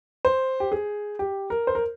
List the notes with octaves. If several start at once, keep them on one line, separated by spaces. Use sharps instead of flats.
C5
G4
G#4
G4
A#4
C5
A#4